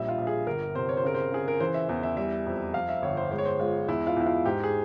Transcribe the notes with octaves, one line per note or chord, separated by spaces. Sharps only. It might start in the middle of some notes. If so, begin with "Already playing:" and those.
Already playing: A#1 G3 E5
F4
A#1
G#4
G1 A#4
C3 C5
C#5
C5
C#3 A#4
C5
C#3 G#4
A#4
E3 C5
E5
E2 E5
E5
G3 E5
F2
F3 F5
E5
G1 C#5
C5
G#3 C5
C#5
C5
G#3 F4
E2 E4
F4
E2 E4
F4
G#2 G4
G#4